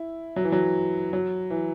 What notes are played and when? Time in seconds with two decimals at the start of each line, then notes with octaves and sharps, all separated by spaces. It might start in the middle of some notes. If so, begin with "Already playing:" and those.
Already playing: E4
0.36 F#3
0.44 E3
0.52 F#3
1.13 F#3
1.50 E3